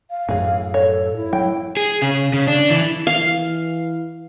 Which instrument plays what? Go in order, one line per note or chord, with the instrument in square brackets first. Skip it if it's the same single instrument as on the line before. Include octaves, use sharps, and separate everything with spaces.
[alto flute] F5
[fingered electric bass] F#2 A2 [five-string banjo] E3 G#4
[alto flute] A4 [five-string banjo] C#5
[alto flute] E4
[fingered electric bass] F#3 [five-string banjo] G5
[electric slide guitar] G#4
C#3
C#3
D4
E3
[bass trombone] E3 [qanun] F5